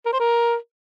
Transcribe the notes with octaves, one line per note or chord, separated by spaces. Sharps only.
A#4
C5
A#4